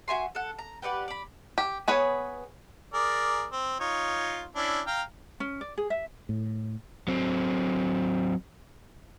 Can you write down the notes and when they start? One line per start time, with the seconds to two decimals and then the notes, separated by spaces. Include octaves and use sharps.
0.08 F#4 E5 G#5 C6
0.35 A4 F#5
0.58 A#5
0.82 G4 B4 D5 F#5
1.08 D5 B5
1.58 G4
1.88 B3 G#4 B4 C#5
2.94 G#4 A#4 D5
3.52 C4
3.80 D#4 F4 C#5
4.55 C#4 D4 E4
4.87 F5 G5 A#5
5.40 C#4
5.61 D5
5.78 G#4
5.90 E5
6.29 A2
7.08 F#3 C4